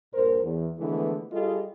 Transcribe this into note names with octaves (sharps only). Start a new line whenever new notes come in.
G2 A#2 A#4 C5
E2
D3 E3 F3 G#3 A3 B3
G3 F4 G#4 A4 D#5